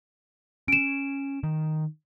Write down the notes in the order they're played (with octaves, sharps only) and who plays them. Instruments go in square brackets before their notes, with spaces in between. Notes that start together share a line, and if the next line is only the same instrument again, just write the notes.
[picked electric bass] C#4 [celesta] D7 E7
[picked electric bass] D#3